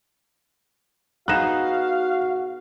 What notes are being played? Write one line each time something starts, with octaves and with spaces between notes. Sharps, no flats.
B3 D#4 F#4 G#4 F5 F#6 E7